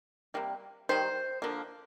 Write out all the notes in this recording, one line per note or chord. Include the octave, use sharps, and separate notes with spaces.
C3 G3 A#3
D#3 G3 C5
D3 F3 A#3